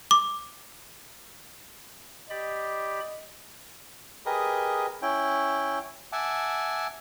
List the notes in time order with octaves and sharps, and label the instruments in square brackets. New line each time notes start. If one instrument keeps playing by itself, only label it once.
[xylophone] D6
[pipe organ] G4 D5 B5 [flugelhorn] D#5
[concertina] G4 G#4 A#4 B4 D#5
C#4 E4 G5
E5 F#5 G#5 A5 D6